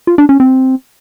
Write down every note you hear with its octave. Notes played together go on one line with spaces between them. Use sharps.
F4
D4
C#4
C4